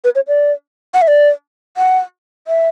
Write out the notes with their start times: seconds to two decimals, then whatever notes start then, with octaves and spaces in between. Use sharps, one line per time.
0.04 B4
0.15 C#5
0.28 D5
0.94 F#5
1.02 E5
1.08 D5
1.77 F#5
2.48 E5